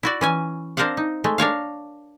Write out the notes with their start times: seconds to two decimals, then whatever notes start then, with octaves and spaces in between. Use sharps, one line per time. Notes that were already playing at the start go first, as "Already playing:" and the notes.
0.03 E4 F#4 D5
0.21 E3 C#4 G#5
0.77 C4 D4 A#4 C5 F5 F#5
0.97 D#4
1.24 G#3 A3
1.38 D4 A#4 C#5 F5